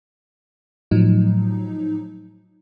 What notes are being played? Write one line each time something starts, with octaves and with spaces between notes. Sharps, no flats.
A2 F3 F#3 D#4